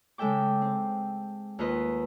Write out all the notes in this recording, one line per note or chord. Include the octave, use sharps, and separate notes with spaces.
C#3 G#3 A4 E5 G5 D6
C4
D#2 D#4 F4 B4 D#5